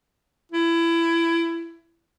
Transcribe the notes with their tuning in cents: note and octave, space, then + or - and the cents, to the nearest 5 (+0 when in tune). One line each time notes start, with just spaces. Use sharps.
E4 +20